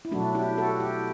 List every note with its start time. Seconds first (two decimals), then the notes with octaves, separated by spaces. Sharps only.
0.05 E4
0.12 B2 F#3 A3 D4 F#4
0.35 E4 G4
0.58 F#4 A4
0.80 E4 G4